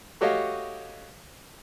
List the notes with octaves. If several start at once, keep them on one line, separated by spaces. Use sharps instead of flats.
A3 F#4 G4 C#5 D#5 F5